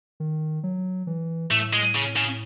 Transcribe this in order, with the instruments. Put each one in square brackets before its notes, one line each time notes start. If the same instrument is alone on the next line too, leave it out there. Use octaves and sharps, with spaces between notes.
[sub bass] D#3
F#3
E3
[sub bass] A2 [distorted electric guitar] A3
[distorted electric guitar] G#3
C#3
C#3